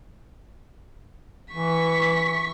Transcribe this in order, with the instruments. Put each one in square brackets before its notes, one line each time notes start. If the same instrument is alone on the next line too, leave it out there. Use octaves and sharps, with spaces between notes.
[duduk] E3 [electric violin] C#6 B6